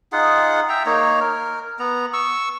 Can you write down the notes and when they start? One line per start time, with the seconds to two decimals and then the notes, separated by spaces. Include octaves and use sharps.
0.12 D#4 F4 G#4 F#5
0.69 E5 G5 A#5
0.86 A#3 D#4 C#5 A#5
1.21 A#4
1.79 B3 A#5
2.13 C#6 E6